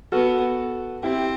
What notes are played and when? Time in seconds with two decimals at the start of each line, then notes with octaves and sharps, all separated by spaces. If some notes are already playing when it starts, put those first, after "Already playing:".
0.12 B3 F#4 A4
1.03 C4 E4 G4